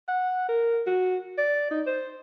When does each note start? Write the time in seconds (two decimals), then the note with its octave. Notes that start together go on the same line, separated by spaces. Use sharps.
0.09 F#5
0.49 A#4
0.86 F#4
1.38 D5
1.71 D#4
1.86 C5